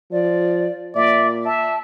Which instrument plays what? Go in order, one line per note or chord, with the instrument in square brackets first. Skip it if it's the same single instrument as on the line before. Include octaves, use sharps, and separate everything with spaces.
[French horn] F3 [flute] D5
[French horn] A#2 [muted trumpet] D5 [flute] E5
[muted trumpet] E5 [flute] A5